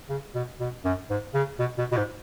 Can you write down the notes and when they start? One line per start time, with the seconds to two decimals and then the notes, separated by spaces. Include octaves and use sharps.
0.09 C#3
0.35 B2
0.60 B2
0.85 F#2
1.10 G#2
1.34 C#3
1.59 B2
1.78 B2
1.92 B2
1.97 G#2